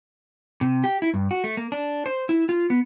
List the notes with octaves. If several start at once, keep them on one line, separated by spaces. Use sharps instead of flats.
C3
G4
E4
G2
F#4
A3
A#3
D4
C5
E4
F4
B3